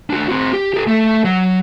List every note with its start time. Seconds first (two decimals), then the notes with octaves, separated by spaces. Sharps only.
0.10 D4 F#4
0.29 C4 F#4
0.53 G4
0.74 G4 A4
0.87 A3 A4
1.24 F#3